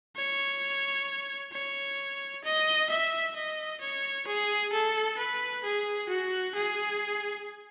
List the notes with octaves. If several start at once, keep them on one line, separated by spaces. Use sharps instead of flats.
C#5
C#5
D#5
E5
D#5
C#5
G#4
A4
B4
G#4
F#4
G#4